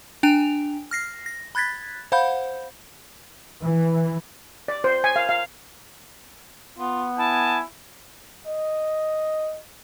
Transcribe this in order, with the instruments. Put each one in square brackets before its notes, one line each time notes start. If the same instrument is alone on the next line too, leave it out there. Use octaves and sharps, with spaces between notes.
[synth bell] D4 G5 G#5 D7 F7
F6 A#6 C7
A#6
B5 F#6 G#6 A6 B6
C5 F5 F#5 B5 G6
[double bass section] E3
[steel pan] D5
C5
G#5
F5
F5
[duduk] B3 [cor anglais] F4
[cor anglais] E4 [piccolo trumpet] G#5 [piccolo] A5
[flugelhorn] D#5